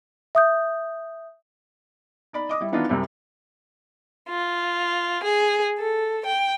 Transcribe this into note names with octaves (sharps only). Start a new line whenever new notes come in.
E5 D#6 G6
D#4 D5 B5
D#5 D6 D#6
G3 E4
D#3 E3 B3 D4 D#4 F4
C2 F#2 C3 G3
F4
G#4
A4
G5